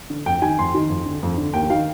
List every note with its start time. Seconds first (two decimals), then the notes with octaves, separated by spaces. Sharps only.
0.10 D3
0.26 F2 G5
0.42 D#3 G#5
0.59 F2 C6
0.74 D#3
0.90 F2
1.06 D3
1.23 F2
1.38 D3
1.53 D#2 G5
1.70 D#3 F5